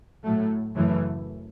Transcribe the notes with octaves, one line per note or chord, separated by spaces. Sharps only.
A2 F#3 A3
F#2 C#3 E3 A3